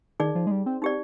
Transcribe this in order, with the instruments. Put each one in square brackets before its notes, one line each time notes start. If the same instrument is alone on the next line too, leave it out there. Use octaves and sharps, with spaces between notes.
[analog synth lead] D#3 [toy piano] D#4 G#4 D5
[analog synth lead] F3
G#3
G3
C4
[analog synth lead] C4 [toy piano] D#4 G4 D5